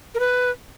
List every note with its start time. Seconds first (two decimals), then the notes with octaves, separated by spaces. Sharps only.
0.15 A#4
0.20 B4